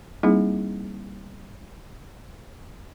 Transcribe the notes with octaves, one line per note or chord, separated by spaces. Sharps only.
G3 A#3 C4 D#4 E4 G#4